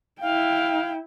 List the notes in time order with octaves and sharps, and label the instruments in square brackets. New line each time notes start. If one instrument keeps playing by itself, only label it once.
[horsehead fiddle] E4 G5 [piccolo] F5